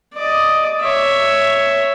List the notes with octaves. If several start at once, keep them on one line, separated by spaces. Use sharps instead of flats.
D5 D#5
C#5 E5